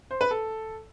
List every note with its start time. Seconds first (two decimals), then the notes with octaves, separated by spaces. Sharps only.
0.11 C5
0.21 B4
0.31 A4